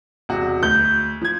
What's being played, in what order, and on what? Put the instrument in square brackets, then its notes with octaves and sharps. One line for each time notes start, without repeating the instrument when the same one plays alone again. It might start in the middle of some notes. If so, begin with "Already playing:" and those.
[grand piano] E1 C3 F#4
[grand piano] D2 [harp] G6
[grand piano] F3 G#6